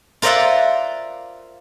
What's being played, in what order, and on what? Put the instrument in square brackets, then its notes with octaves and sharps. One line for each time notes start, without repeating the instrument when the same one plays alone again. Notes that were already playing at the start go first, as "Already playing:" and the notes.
[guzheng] F4 A#4 C5 D5 E5 F#5